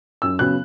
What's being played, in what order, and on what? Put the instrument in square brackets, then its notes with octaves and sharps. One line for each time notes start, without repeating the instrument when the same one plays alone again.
[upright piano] F#2 E6
C#3 F#3 B3 F#6